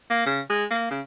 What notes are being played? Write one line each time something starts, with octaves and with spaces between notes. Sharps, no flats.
A#3
C#3
G#3
A#3
C#3